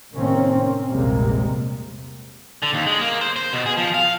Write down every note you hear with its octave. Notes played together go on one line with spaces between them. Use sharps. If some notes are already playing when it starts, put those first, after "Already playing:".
A2 C3 D#3 A#3 C4 C#4
A#1 E2 C3 G3 G#3 A#3
D3
D#2
G#3
A#3
C5
C5
B2
G#4
F3
F5